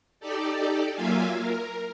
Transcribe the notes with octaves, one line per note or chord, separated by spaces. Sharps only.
D#4 G4 A4 D5
F#3 A#3 F4 E5 F5 G#5
A#4